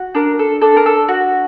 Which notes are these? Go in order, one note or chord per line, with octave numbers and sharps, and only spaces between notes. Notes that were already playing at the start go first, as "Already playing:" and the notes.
Already playing: F#4
D4 A#4
A4
D4 A4
A#4
A4
F#4